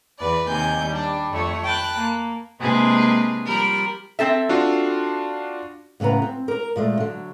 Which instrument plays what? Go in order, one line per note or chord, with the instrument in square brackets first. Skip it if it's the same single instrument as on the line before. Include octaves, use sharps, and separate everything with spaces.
[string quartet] E2 B4 D5
D#2 C3 G#5 G6
G3 D4
F2 A3 C#5
G5 A5 B5 F#6
A#3
C3 G#3 A#3 D4 G#4 B4
F3 G3 A#4 B5
[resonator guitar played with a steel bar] C4 A4 E5
[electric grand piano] D4 F4 F#4
[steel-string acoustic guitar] A2 C#3 B3 B4 A#5
C4
A#4 A#5
A#2 G#3 A3
D3 F#3